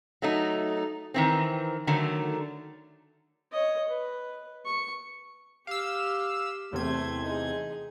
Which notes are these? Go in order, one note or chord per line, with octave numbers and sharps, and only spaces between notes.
F#3 A3 D#4
D#3 E3 C4
D3 D#3 F#3 A3
C#5 D#5
B4
C#6
G4 F5 E6
E2 C3 A3 C5 G#6
D#4 G#4